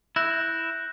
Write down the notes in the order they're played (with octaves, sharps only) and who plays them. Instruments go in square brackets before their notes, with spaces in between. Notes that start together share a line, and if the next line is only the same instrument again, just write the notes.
[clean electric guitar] E4 [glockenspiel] F#6 G6 A#6